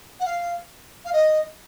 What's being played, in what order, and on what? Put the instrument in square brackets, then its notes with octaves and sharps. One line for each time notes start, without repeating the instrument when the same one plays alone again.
[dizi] F#5
F5
F5
D#5